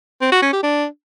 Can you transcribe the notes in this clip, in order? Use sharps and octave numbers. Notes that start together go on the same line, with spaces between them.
C4
F#4
C#4
G4
D4